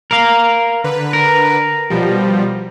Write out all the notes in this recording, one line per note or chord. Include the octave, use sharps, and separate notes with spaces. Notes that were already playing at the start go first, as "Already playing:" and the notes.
A#4 F5
D3 B4
A#4
B2 F3 G3